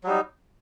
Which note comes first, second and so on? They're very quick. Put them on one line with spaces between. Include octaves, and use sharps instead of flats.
F#3 G3 D#4